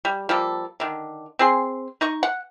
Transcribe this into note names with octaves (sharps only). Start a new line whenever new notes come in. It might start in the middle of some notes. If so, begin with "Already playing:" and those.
G3
F3 G3 A#3 A4
D3 D#3
C4 G#4 C6
D#4 D#5 C#6
F#5